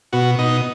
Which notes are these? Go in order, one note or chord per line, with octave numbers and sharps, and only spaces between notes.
B2 F#4
B2 D#4